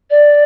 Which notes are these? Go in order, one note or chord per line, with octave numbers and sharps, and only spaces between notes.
D5